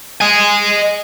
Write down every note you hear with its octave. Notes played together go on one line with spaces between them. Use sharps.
D#5 G#5